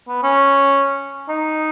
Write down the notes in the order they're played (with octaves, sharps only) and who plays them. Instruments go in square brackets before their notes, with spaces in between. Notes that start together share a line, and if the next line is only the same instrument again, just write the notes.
[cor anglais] B3
C#4
D#4